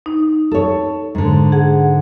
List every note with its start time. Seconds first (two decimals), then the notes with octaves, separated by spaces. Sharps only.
0.06 D#4
0.51 A4 C#5
1.15 G#2 D3
1.52 G#4 F#5